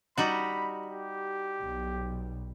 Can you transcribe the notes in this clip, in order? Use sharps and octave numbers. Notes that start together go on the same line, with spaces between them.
G3 D#4 F#4 B5
G4
B1